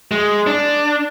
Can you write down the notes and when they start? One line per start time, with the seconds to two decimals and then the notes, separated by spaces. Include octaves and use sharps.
0.11 G#3
0.47 D4